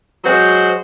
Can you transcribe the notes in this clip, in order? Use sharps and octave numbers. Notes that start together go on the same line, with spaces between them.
F#3 G#3 F#4 C5